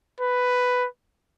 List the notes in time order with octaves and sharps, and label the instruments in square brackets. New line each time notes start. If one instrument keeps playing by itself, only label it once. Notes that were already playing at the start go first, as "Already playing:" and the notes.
[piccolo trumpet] B4